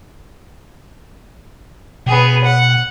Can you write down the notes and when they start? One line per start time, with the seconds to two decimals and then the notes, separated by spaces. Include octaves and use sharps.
2.06 B2 B3 G#4
2.44 F#5